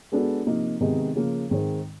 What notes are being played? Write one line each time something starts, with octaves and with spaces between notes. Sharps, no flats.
G#3 B3 D4 F#4 A4
C3 F3 A#3 D#4
C3 D#3 G#3 B3 D#4
C#3 F3 A#3
G#2 D#3 G#3 C4